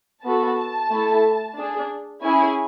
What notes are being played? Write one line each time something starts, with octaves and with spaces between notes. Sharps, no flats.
B3 F#4 A4 A5
A3 E4 A4
D4 G#4
C#4 E4 G#4 G#5